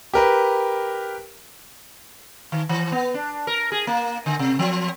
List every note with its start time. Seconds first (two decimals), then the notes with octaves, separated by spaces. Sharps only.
0.14 G4 A#4 B4
2.52 D#3
2.69 E3
2.92 B3
3.14 D4
3.47 A#4
3.72 G#4
3.87 A#3
4.26 D3
4.39 C3
4.59 F3